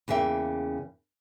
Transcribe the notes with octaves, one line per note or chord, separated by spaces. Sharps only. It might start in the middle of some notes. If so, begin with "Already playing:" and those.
E2 C#3 A#3 E5 G5